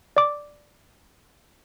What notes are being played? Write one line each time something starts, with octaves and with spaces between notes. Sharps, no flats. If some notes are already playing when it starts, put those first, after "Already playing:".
D5 D6